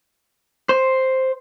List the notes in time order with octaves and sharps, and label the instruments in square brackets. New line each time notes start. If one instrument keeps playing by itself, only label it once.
[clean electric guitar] C5